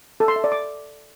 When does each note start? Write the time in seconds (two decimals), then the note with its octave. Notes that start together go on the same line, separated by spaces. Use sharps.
0.20 A4
0.28 C6
0.36 E5
0.44 D5
0.52 D6